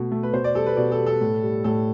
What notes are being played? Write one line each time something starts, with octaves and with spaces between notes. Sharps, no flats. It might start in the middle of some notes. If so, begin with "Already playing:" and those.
Already playing: B2 A3
A3
B4
B2 C5
D5
G3 A4
B4
B2 D5
A4
G3
A4
A2
G3
A2 A4